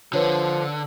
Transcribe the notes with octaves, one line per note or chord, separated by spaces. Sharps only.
D3 F3 B4 C#5